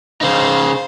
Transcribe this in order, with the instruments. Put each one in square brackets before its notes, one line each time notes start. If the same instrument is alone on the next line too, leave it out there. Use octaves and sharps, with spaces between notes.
[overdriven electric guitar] C#3 D#4 [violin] C5 F5